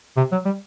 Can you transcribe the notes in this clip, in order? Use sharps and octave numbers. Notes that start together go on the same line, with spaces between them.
C3
F#3
G3